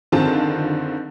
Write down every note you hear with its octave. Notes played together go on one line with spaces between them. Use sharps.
F#1 D3 D#3 C4 F4 A5